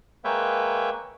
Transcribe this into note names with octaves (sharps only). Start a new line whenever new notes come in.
G#3 A#3 B4 C#5 E5 G5